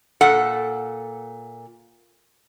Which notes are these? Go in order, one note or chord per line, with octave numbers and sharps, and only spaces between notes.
A#2 A4 F#5